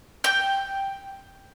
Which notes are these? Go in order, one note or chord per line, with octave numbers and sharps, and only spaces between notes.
G5 G6